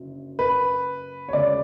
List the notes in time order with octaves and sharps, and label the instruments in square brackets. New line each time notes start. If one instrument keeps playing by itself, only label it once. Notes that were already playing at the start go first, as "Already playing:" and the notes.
Already playing: [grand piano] F#1 F#2 D3 F#3
[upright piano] B4
C#5
[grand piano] D2 C#3 G#3 B3 D4 [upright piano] D5